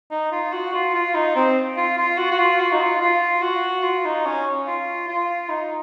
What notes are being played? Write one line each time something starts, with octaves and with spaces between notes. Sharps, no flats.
D#4
F4
F#4
F4
F4
D#4
C4
F4
F4
F#4
F#4
F4
F#4
D#4
F4
F4
F#4
F4
D#4
C#4
F4
F4
D#4